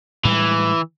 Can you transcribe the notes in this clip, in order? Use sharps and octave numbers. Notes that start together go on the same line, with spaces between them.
A2 E3 G3 G#3